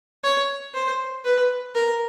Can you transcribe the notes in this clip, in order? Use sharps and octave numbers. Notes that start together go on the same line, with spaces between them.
C#5
C5
B4
A#4